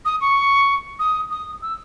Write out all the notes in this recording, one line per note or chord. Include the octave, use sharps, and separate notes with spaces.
D#6
C#6
D#6
D#6
E6